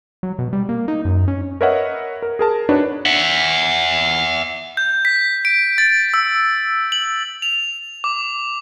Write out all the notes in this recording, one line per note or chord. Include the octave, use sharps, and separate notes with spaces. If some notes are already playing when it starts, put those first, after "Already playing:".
F#3
B2
G3
A#3
D#4
F#2
C#4
A#4 B4 C#5 D#5 E5 F#5
A#4
G#4 A#4 A5
D4 D#4 F#4 B4 C#5
E5 F#5
G6
B6
D7
A6
E6
F#7
F7
D6